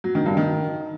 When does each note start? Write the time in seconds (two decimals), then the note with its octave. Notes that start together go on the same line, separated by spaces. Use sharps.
0.04 F#3
0.15 D#3
0.26 G2
0.37 D#3